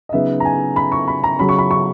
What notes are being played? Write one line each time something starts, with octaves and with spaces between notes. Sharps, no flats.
D#5
C#3 F#3 B3 D#4 E5
A#5
G#5
B5
C#6
B5
A#5
C#3 F#3 C#4 B5
C#6
B5
C#6